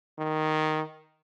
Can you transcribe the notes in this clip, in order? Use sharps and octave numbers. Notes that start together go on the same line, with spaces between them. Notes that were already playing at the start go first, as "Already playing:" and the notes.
D#3